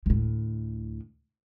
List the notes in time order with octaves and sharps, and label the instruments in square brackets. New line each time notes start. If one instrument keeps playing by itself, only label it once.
[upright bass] D2 A2